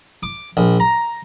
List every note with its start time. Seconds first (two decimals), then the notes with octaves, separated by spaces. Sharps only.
0.23 D6
0.57 A#1
0.80 A#5